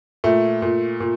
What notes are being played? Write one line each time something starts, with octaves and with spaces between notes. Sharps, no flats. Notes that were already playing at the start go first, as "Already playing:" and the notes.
A#2 A3
A#2
A#2